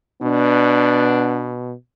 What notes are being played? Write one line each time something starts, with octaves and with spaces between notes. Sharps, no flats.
B2 B3 D4